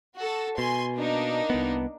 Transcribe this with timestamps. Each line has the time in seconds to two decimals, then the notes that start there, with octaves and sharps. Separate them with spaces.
0.17 F#4 A4
0.58 B2 G#5 C6
0.95 A#3 D4 D#4
1.50 C2 B3